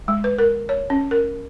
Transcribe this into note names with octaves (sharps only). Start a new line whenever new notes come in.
G#3
B4
A#4
C#5
C#4
A#4